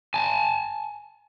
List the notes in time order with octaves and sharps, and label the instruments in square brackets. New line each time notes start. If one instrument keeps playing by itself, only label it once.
[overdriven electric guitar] G#5 A5